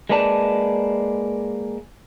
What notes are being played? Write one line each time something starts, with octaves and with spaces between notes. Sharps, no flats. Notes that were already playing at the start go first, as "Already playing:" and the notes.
G#3 A#3 B4 D5 A5